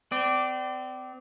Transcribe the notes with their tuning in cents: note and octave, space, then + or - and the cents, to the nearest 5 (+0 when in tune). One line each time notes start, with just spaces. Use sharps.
C4 -35 D5 +0